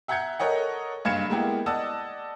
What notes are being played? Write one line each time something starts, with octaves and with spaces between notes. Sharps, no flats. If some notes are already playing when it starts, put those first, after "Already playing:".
E5 F#5 A#5 G6 G#6 C#7
A4 A#4 C#5 D#5 F#5
F#1 G2 F5 G#6 C#7 E7
G#3 A#3 B3 E4 G4 A#4
D5 D#5 F#5 A5 D#6 E6